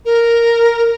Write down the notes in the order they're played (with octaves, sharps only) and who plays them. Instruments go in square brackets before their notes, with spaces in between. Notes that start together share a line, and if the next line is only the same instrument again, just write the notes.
[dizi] A#4